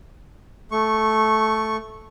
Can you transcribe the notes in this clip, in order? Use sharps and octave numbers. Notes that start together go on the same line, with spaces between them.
A3 C#6